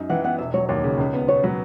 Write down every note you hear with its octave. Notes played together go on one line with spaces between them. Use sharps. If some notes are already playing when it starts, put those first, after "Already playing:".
Already playing: F#2 D#4
E3 F#5
B3 F#5
E1 E5
F#3 C#5
D#2 C#5
C#3
C#2
B3
B2 C#5
F#3 B4